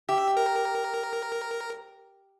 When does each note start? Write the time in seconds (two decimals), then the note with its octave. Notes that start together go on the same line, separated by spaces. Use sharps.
0.09 G4 E5
0.37 A#4